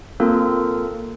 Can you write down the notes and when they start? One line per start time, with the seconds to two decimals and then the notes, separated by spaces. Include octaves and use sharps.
0.20 A#3 C4 F4 A4 A#4